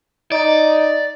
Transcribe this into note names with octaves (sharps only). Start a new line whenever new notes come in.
D#4 D5